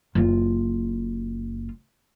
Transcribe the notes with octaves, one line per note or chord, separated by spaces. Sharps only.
F#1 F4